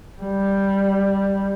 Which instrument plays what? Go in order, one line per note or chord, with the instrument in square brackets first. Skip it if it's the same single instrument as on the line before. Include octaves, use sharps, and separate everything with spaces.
[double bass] G3